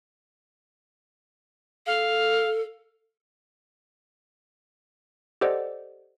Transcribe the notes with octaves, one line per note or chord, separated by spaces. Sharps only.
A4 F5
G4 A4 C5 D5 D#5 F#5